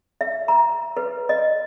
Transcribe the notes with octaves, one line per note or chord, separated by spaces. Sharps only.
E5
A#5
B4
D#5